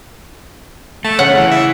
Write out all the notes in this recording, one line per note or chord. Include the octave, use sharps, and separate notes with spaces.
A3 A5
C#3 C#5 F#5
E3
E5